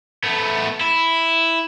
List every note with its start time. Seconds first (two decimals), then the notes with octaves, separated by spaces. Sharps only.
0.24 A3 B3
0.81 E4